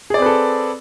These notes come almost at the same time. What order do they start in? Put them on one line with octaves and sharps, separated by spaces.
G#4 D5 C4 B4 A4